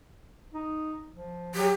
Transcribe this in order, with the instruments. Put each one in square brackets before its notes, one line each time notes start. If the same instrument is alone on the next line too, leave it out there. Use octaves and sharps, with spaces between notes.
[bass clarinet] D#4
F3
[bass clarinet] F#3 [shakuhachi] G4